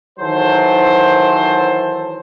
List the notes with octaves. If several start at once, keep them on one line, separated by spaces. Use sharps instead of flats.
D#3 E3 F#3 A4 C5